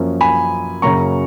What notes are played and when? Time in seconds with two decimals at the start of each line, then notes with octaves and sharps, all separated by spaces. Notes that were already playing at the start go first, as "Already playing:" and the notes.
Already playing: F#2 F3 A#3 C#4
0.21 G#5 B5
0.82 F#2 C#3 F#3 A#3 A#5 C#6